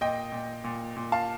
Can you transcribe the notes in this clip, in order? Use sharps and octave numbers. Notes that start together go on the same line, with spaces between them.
A#2 D#5 G5
A#2
A#2
A#2
F5 A5